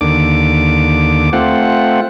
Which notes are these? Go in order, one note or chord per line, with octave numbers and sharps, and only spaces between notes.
D#2 D3 D6
A3 C4 F4 F#5